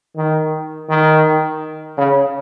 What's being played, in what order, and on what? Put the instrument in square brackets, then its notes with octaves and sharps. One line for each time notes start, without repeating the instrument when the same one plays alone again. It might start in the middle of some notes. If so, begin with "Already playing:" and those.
[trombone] D#3
D#3
C#3